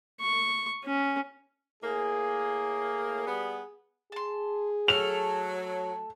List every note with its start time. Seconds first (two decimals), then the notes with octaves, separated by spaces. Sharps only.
0.20 C#6
0.84 C#4
1.83 A2 A#3 G#4
3.27 G3 B3
4.12 G#4 A5 C6
4.88 F#3 A3 A4 F6 F7